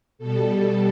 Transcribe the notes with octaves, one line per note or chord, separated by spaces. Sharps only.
B2 G3 A4